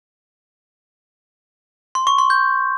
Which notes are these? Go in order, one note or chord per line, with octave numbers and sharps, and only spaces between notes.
C6
C#6
C6
G6